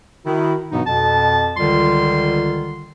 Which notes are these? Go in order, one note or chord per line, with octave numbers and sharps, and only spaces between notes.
D#3 E4 F#4
G2 B2 E3 F#3 B3 D#4
F2 B2 A5
C#2 D3 D#3 G3 F4 C6